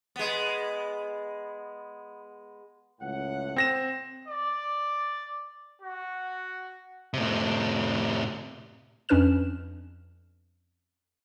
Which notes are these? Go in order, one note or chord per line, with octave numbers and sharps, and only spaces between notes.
G#3 B3
C#2 A2 F#5
C4 A#6 E7
D5
F#4
A2 C3
F2 C#4 D4 B4 F6 E7